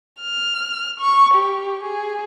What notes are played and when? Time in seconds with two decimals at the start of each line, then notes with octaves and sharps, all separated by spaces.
0.21 F6
1.00 C#6
1.34 G4
1.83 G#4